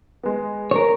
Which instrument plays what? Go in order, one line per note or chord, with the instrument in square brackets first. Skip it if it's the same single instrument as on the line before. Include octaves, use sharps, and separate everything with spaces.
[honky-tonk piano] G#3 B3
[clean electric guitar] A#4 C#5